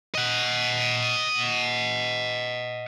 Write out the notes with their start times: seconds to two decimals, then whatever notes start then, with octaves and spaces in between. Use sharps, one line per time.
0.15 D#5 F#5